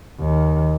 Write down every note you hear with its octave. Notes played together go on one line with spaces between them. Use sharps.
D#2